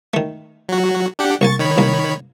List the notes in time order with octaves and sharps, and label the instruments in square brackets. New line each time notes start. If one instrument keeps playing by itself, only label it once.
[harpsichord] D#3 A3
[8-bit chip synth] F#3 F#4
D4 G4 F#5
[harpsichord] C2 A#3 G#5 [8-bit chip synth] C#6 A6
[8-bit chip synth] D#3 C#5 B5
[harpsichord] C2 A#3